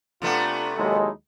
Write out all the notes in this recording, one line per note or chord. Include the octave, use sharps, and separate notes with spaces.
C3 A3 B3 D4 F4
D#2 F#3 G#3 D#4 E4 A4